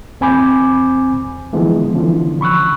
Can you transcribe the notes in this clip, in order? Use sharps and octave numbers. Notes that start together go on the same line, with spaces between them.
E2 C4 G#5 B5 D6 G6
D3 E3 F3 G#3 B3
D3 E3 F3 C#4
B5 C#6 E6 F#6